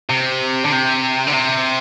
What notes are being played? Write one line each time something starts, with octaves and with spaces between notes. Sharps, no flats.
C3
D3
C3
D3
C3